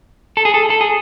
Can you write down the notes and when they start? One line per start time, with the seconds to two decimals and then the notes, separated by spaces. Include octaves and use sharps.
0.37 A4
0.45 G#4
0.54 A4
0.70 A4
0.81 G#4